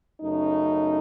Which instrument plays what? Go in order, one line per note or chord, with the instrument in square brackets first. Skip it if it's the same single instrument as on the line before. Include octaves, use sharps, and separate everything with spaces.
[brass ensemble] F#2 C#3 A3 D#4